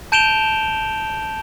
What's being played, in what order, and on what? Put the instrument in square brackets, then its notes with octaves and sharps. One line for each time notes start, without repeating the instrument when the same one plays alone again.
[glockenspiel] A5 G6 D7 E7 F7 G7